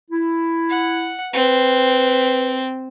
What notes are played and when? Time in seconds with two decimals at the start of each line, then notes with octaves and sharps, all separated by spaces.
0.11 E4
0.70 F#5
1.34 C4 B4